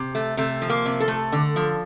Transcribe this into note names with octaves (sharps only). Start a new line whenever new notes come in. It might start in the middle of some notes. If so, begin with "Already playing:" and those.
Already playing: C3
A3
C3 A3
F3
A#3
C3
A4
A3
D3
F3